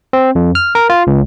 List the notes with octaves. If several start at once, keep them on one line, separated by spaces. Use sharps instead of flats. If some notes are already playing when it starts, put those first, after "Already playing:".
C4
F2
F6
A#4
F4
C#2